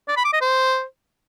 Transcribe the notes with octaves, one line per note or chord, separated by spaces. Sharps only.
D5
B5
D6
D#5
C5